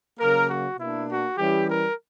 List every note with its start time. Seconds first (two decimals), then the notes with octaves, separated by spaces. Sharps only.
0.19 C#3 F#3 A#3 A#4
0.49 F#4
0.78 B2 A#3 D4 E4
1.09 F#4
1.38 E3 G3 C#4 E4 G4
1.68 A#4